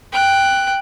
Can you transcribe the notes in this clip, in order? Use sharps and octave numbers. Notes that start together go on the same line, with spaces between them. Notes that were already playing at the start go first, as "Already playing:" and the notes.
G5 F#6